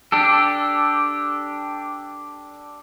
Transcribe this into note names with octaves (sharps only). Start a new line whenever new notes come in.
D4 G4 A4